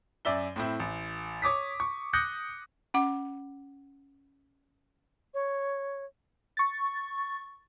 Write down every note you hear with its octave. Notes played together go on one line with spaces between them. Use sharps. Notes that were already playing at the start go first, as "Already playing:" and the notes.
F#2 D5 E5 G7
A2 C4 E4
A1
C#5 D6 D#6 B6
C#6
D6 D#6 F#6 G6 A#6 C#7
C#4 F#5 D6
C#5
C#6 A6